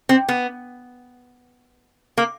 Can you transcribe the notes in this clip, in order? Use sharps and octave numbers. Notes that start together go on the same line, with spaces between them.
C4
B3
A#3